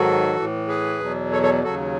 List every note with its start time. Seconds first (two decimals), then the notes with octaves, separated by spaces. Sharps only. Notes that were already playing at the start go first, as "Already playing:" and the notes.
Already playing: G#2 D#3 F#3 F#4 A4
0.36 A2 E3
0.68 G#4 B4
1.00 E2 B2 F#3
1.32 A4 C#5
1.42 A4 C#5
1.64 D#2 C#3 F#3 F#4 A4